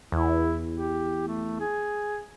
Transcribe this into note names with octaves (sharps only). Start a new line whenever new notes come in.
E2 E4
G4
A3
G#4